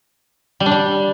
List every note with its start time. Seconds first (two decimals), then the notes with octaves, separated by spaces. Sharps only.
0.60 G3
0.66 D4
0.71 G3